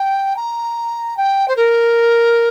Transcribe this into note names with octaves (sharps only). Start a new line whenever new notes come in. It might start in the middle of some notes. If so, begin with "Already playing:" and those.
Already playing: G5
A#5
G5
C5
A#4